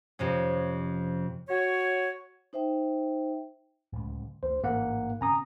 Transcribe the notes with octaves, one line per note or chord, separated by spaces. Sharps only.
F2 C3 C#4
F#4 C#5
D#4 C5 E5 G5
D1 C#2
D2 C5
A1 G#2 A#3 F#5
C#3 C4 C#4 G#5 A#5 D#6